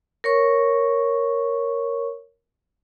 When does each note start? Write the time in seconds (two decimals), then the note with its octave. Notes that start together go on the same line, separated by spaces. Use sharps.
0.24 A#4 C#5 C#6